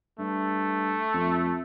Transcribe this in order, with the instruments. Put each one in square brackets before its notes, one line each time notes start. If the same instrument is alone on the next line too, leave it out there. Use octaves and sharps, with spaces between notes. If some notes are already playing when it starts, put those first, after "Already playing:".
[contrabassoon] G2 [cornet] A3
[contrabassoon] F2